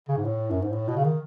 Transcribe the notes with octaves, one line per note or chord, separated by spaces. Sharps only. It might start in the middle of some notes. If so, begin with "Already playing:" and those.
C#3
G#2
A2
F#2
G#2
A2
B2
C#3
D#3